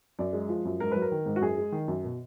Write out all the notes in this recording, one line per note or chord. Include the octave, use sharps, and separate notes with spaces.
F#2 D5
G#3
F3
F#2
G#2 A#4
F#3 B4
A#4
D#3
G#2
F#4
F#2 G#4
G#3
D#3
F#2
B2